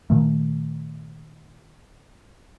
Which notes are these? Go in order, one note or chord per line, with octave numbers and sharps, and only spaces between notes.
A#2 D#3 A3